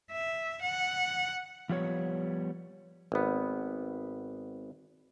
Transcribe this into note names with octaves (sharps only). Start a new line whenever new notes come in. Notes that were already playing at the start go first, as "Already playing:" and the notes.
E5
F#5
F3 G3 B3 C#5
G#1 B3